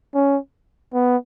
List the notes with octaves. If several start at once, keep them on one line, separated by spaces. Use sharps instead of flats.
C#4
B3